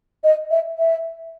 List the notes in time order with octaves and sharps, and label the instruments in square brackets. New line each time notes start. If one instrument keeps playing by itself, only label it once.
[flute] D#5
E5
E5